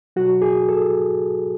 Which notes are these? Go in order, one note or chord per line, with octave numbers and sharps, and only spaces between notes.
B2 F#3 F#4
G#4
A4